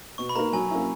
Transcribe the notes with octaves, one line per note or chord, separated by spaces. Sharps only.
B2 C#6
B5
A#3 D#4 A#4 A#5
F#3 G#5
A#3 C#4 E4